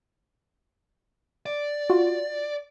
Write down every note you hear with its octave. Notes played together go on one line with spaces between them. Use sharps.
D5
F4 F#4